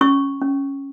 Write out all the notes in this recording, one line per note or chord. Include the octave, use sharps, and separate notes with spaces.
C#4 C#6
C#4